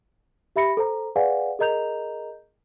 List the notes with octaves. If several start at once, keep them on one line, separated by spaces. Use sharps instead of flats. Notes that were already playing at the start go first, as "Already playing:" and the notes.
G4 E5 B5 A#6 C#7
A4 C5 A#5
G#4 B4 D5 F5 F#5 G#5
G#4 A#4 D#5 A#5 G6 F7